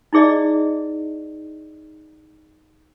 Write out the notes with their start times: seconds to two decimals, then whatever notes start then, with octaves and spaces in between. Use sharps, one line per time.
0.13 D#4 E4 G#4 D5 D#5